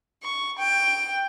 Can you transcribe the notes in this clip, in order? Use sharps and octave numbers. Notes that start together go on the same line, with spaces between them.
C#6
G5